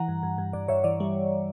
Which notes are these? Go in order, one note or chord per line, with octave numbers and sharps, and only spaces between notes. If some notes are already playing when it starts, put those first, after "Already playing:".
Already playing: E3 F#5 A#5
G2
G2
G2
G2 D5
G2 C#5 E5
E3 D5
G3